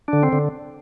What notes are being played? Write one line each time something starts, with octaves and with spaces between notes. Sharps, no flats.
D3 D4
C4
D3